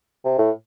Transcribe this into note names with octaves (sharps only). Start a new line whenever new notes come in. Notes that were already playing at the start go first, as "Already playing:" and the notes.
C3
A2